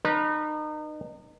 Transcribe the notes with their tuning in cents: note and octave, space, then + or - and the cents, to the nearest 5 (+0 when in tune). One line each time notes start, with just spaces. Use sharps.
D#4 -30 B4 -35